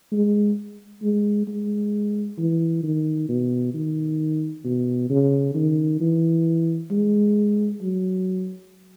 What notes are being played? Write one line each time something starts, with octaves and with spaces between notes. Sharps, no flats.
G#3
G#3
G#3
E3
D#3
B2
D#3
B2
C#3
D#3
E3
G#3
F#3